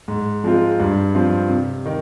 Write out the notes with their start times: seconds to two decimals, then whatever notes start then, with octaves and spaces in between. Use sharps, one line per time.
0.08 G#2
0.44 F3 G#3 C4 F4
0.80 G2
1.15 F3 C4 F4
1.50 C3
1.86 D#3